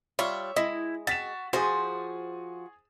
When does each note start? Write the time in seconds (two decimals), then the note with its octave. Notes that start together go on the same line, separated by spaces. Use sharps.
0.19 G3 F4 C#5 E5
0.56 G#3 E4 D#5
1.07 F#4 A6 B6 E7
1.53 F3 F#4 G#4 C5 G#5